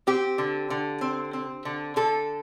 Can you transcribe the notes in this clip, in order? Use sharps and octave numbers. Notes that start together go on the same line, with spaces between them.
C4 G4
D3
D3
C4
C4
D3
D3 A4